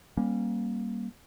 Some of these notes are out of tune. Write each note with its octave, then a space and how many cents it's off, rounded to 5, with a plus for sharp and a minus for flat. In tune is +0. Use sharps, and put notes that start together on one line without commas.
G3 +0 A#3 +15 C#4 -20